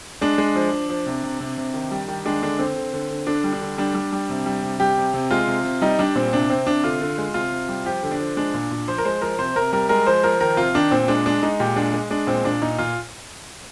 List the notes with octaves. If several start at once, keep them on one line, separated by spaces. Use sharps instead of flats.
G#3 D4
G#3
F3
F3
F3
C3
C3
C3
C3
D#3
G3
D#3
G#3 D4
D3 D4
D3 C4
D3
D3
D3
D3 D4
G3
D4
D3
G3 D4
G3
G3
C3
G3
C3
G3 G4
C3
C3
G#3 F4
C3
C3
G3 D#4
G3 D4
A#2 C4
C3 D4
C3 C4
C3 D4
D3 F4
D3
G#3
C3 F4
C3
G3
F3 G4
D3
D4
F3
G#3 D4
A#2
A#2
F3 C5
A#4
G#3 C5
F3 A#4
C3 C5
C3 A#4
G3 A#4
G#3 A#4
F3 C5
F3 A#4
D#3 A#4
C3 F4
D#3 D4
A#2 C4
G#3 D4
G#3 D4
G#3 D#4
A#2 G4
G#3 D4
G#3
G#3 D4
A#2 C4
A#2 D4
A#2 D#4
A#2 F4